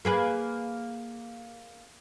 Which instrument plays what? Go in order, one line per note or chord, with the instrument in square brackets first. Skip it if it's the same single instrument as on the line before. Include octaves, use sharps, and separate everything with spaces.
[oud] A#3 G#4 B4